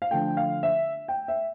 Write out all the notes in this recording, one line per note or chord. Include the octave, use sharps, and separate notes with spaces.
F5
D3 F3 A3 G5
F5
E5
G5
E5